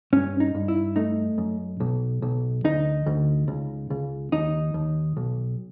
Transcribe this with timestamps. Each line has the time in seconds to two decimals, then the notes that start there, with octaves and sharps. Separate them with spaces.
0.13 G2 C#4
0.40 D#4
0.55 G2
0.68 E4
0.96 A3 D#4
1.38 F#2
1.80 B1
2.22 B1
2.64 D2 D#4
3.06 D2
3.48 C#2
3.90 C#2
4.32 D#2 D#4
4.74 D#2
5.17 B1